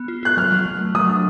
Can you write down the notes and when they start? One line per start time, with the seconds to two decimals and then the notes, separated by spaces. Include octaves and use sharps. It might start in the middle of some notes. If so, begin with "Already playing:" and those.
Already playing: B3
0.08 F4
0.23 F4 F#6
0.37 F#3 F6
0.52 F#3
0.66 F#3
0.80 A3
0.95 F#3 D#6
1.09 D4